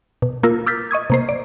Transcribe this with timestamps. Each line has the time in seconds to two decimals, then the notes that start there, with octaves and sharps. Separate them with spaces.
0.22 B2
0.43 A#3 F4 A#4 E6
0.66 D6 E6 F6 G6 A6 B6
0.91 D#5 C#6 D#6 G#6
1.10 C3 A#3 C5
1.29 D5